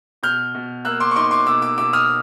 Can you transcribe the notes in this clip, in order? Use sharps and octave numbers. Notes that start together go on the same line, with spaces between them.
B2 F6 G6
B2
A#3 E6 F#6
C6 D6
C#6
D#4 C6 D6
C6 D6
B2 D6 E6
D6 E6
B2 D6 E6
D#6 F6